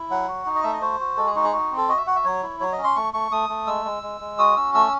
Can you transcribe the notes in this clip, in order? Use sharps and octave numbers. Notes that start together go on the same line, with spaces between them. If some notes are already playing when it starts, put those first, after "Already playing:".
Already playing: E4
F#3 F#5
F#4
D#4
D#5
A3 E5
D#5
F#4 C5
F#4
G#3 A4
G#4
D#4 F#4
G#4
F#4
C4
A4
F#4 D#5
E5
F#4 F#5
E5
F#3 C#5
E4
F#3 C#5
D#5
C#4
C6
A3 C#6
A3 C#6
A3 D#6
A3
G#3 E6
G#3
G#3
G#3
F#4 D#6
C#4 E6
A3 E6